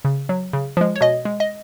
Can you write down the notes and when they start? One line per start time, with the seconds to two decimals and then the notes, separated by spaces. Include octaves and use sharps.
0.05 C#3
0.29 F#3
0.53 C#3
0.77 F3 G#3
0.96 C#5
1.01 B2 D#5
1.25 G#3
1.40 D#5